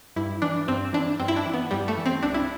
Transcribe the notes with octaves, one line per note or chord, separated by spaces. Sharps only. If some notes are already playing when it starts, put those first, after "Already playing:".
G2 E4
E3 D4
G2 C4
E3 D4
G2 C4
E4
D4
E3
B3
G2 G3
A3
E3
C4
C2 D4
E4